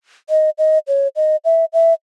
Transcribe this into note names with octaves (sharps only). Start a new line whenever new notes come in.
D#5
D#5
C#5
D#5
E5
E5